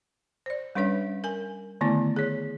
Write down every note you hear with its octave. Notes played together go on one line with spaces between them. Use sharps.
C5 D5
G3 C#4 D4 B4 C#5 E5
A#4 G#5
D3 D#3 A3 B3 E4
G#4 C#5